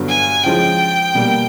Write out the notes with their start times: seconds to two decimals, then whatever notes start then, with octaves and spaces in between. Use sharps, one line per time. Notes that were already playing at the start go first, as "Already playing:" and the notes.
Already playing: G2 D3 F#3 B3
0.09 G#5
0.43 C#3 F3 G#3 G5
1.15 B2 G3 A#3